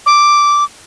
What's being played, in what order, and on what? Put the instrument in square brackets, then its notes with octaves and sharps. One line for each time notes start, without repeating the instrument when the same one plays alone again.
[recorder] D6